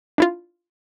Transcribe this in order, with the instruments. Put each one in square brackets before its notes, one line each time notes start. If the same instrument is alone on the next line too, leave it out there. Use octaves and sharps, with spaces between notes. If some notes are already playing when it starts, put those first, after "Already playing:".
[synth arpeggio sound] D4 E4 F4